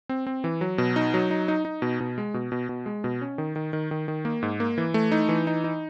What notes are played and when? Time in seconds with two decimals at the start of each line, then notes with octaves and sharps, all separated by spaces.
0.09 C4
0.27 C4
0.44 E3
0.61 F#3
0.78 B2
0.96 D#4
1.14 F#3
1.31 D#4
1.48 D#4
1.65 D#4
1.82 B2
2.00 B2
2.18 G#3
2.34 B2
2.52 B2
2.69 B2
2.86 G#3
3.04 B2
3.21 C#4
3.38 D#3
3.56 D#3
3.73 D#3
3.91 D#3
4.08 D#3
4.25 A#3
4.43 G#2
4.60 A#3
4.78 E3
4.94 A3
5.12 D#4
5.29 E3
5.47 D#4
5.64 D#4